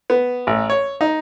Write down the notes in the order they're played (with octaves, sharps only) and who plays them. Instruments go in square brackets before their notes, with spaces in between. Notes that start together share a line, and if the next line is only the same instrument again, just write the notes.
[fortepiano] B3
A1
C#5
D#4